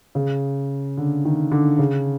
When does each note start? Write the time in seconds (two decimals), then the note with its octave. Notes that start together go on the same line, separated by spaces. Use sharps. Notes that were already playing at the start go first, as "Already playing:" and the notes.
0.15 C#3
0.97 D3
1.25 D#3
1.51 D3
1.79 C#3